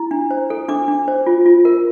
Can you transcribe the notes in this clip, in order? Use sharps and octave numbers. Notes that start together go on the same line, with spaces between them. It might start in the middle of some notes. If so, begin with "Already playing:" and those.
Already playing: E4
D4
C5
A4
D4 D6
D4
C5
F4
F4
A#4